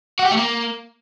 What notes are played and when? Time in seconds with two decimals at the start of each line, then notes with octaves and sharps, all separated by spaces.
0.19 F#4
0.25 G4
0.31 A3
0.37 A#3